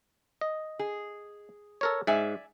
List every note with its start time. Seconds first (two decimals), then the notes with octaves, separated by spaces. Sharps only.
0.41 D#5
0.79 G#4
1.81 A4 A#4 C#5
2.07 G#2 D5 E5 G#5